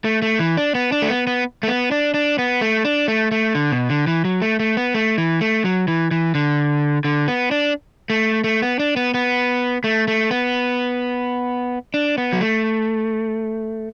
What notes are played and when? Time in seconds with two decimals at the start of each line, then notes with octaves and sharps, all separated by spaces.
0.05 A3
0.22 A3
0.39 E3
0.57 D4
0.75 B3
0.92 D4
1.02 A3
1.10 B3
1.27 B3
1.63 A3
1.68 B3
1.91 D4
2.14 D4
2.38 B3
2.61 A3
2.85 D4
3.08 A3
3.32 A3
3.55 D3
3.72 B2
3.90 D3
4.07 E3
4.25 F#3
4.42 A3
4.60 A3
4.77 B3
4.94 A3
5.18 E3
5.41 A3
5.65 F#3
5.88 E3
6.11 E3
6.35 D3
7.04 D3
7.28 B3
7.51 D4
8.10 A3
8.44 A3
8.62 B3
8.79 D4
8.96 B3
9.14 B3
9.84 A3
10.08 A3
10.31 B3
11.94 D4
12.18 B3
12.33 F#3
12.41 A3